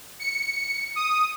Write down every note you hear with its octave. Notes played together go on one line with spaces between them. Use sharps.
C#7
D#6